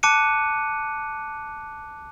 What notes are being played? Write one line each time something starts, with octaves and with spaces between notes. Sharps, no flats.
A5 D6 F#6 C#7 D#7